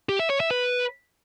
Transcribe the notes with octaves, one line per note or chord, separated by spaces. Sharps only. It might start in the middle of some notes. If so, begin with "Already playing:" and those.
G4
E5
C#5
E5
B4